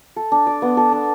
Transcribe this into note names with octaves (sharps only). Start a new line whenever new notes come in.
A4
D4
D5
B3
A4
D4